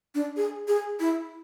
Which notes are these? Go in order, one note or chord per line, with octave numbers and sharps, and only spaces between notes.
D4
G#4
G#4
E4